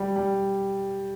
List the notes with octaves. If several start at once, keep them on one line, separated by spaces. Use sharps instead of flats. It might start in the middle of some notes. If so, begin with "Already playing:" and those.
Already playing: G3
G3